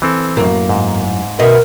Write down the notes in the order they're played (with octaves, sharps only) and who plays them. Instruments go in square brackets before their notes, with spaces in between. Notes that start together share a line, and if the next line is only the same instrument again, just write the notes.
[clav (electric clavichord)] E3 C4 A4
[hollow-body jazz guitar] F#2 A2 [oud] A#3
[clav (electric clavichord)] G#2
[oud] B2 [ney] A#4 [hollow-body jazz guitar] D#5 E5